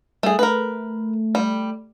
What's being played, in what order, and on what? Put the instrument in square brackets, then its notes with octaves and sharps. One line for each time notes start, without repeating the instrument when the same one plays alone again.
[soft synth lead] G3 [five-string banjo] A3 G#4
[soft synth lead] A3 [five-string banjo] A#4 B4
[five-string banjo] G3